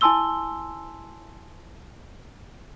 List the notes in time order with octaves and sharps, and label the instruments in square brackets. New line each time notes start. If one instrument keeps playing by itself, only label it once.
[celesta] E4 G#5 A5 C6 E6 G7